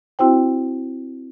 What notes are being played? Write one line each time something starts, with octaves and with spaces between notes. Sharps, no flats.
C4 E4 F#4 C5 G5